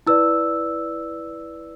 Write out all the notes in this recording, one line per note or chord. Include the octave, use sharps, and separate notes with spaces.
E4 B4 D5 E6